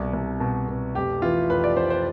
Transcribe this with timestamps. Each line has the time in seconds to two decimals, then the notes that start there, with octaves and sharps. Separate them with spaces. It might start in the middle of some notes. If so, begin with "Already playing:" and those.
Already playing: C2 B2
0.13 C2
0.40 B2
0.68 B2
0.95 F1 G4
1.22 E3 F4
1.50 F1 B4
1.64 D5
1.77 F1 C5
1.90 C5